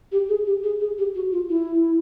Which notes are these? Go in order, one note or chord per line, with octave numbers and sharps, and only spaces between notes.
G4
G#4
G4
G#4
G#4
G4
F#4
F4
E4